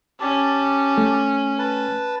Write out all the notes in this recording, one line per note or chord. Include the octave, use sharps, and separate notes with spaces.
C#4 G4 A5
A3
B4 A5